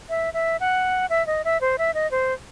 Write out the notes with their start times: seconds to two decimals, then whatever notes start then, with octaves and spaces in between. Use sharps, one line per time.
0.09 E5
0.34 E5
0.60 F#5
1.10 E5
1.27 D#5
1.45 E5
1.61 C5
1.79 E5
1.94 D#5
2.11 C5